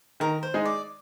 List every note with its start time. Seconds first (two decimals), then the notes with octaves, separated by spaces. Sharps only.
0.20 D#3 A#4
0.43 C5
0.54 G#3 D#4 G#4
0.65 D5